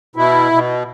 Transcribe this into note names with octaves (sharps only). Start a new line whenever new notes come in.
B2 E4
B2